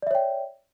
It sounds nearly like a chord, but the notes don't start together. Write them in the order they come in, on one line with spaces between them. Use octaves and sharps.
D5 E5 C#5 G5